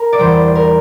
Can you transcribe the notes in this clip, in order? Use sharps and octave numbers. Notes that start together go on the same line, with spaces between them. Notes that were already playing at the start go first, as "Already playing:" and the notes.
Already playing: A#4
D5
E2 E3 G3 C5
A#4